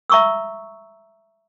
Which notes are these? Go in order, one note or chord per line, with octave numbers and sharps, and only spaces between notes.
E5 A#5 C#6 D#6 E6